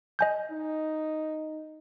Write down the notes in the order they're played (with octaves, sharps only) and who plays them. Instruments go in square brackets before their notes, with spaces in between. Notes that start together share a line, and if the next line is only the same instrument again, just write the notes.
[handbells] D#5 G#5 G6
[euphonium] D#4